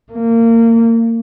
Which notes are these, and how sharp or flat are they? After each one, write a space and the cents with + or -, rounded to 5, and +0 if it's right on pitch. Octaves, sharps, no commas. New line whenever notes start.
A#3 -25